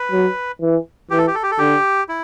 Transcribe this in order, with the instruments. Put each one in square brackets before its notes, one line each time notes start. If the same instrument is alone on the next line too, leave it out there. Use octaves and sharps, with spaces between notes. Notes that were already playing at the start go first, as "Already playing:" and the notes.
Already playing: [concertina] B4
[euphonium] F#3
E3
[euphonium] E3 [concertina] G4
[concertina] A4
G4
A4
G4
A4
[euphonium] D3 [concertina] G4
[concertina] E4